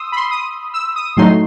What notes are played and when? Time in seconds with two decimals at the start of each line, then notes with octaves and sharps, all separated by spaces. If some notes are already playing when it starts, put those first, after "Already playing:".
Already playing: C6 D#6 E6
0.12 B5
0.16 C6
0.31 D#6
0.74 E6
0.96 D#6
1.17 A2 F#3 A3 D#4 C6